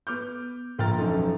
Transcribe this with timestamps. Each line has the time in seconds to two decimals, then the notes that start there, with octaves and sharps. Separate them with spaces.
0.07 B3 D6 F6 G6
0.78 A#1 A#2 G5 A#5 F6 A6
0.98 E1 F#2 F3 F#3 D#4 A4